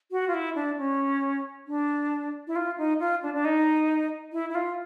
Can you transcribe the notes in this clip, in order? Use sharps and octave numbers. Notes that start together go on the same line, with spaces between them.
F#4
F4
E4
D4
C#4
D4
E4
F4
D#4
F4
D4
D4
D#4
E4
E4
F4